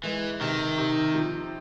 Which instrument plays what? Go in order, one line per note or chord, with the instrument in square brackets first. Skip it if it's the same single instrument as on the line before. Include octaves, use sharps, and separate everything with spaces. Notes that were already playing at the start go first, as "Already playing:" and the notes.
[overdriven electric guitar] E3 [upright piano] G#3
[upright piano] C3 [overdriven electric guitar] D#3
[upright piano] C3
F3